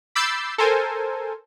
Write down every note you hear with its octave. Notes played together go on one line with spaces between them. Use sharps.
B5 D6 E6 G6 A6 C7
A4 A#4 C5 G#5